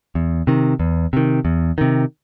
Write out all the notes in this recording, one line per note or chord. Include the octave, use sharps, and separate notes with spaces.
E2
C3 D#3
E2
C3 D#3
E2
C3 D#3